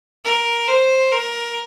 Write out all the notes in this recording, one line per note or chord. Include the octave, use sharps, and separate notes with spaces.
A#4
C5
A#4